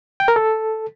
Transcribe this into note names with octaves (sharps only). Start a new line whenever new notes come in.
G5
A#4
A4